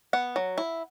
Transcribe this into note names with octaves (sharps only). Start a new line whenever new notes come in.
B3 F#5
F#3
E4